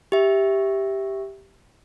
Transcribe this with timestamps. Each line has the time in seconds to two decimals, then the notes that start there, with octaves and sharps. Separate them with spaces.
0.12 G4 E5